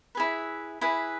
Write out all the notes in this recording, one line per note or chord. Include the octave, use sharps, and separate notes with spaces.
E4 G#4 B4
E4 G#4 B4